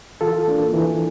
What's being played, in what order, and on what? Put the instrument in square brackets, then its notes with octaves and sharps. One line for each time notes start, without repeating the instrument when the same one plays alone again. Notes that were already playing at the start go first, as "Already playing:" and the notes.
[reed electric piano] E3 F4 A4
A#3 D4
E3